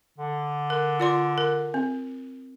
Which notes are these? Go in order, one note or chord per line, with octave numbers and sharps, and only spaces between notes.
D3
A#4
F4 D5 C6
A#4
C4